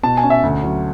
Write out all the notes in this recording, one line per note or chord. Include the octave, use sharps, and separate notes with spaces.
B2 A5
G#5
C#4
E5
D2
F#3